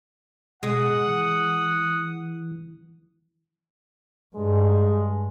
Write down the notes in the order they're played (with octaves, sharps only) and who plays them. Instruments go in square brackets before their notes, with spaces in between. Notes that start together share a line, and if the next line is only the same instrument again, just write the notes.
[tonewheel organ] B2 [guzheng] G#3 [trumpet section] F#5 [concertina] D#6
[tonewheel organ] E3
[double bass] G2 [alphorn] G#3